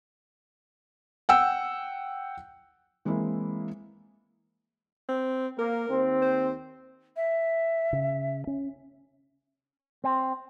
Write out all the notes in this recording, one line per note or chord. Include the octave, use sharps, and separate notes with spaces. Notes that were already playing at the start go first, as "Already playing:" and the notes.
F#5 G5 E6
E3 G#3 A#3 C4 E4
C4
A#3 A#4
D#2 C4
C5
E5
C#3
C#4
C4